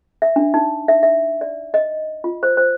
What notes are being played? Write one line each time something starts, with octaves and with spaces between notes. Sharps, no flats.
E5
D4
D#4
E5
E5
D5
D#5
F4
C5
C5